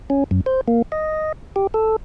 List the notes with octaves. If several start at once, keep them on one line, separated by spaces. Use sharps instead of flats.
C#4
F#2
C5
A#3
D#5
G4
A4